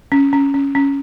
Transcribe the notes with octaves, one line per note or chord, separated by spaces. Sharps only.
C#4
C#4
C#4
C#4